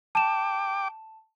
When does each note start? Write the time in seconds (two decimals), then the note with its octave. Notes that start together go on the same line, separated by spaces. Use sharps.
0.15 G5 A5 D6 E7